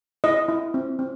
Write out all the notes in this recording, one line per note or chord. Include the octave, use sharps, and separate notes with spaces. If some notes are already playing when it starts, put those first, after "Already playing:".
E4 D#5
E4
C4
C4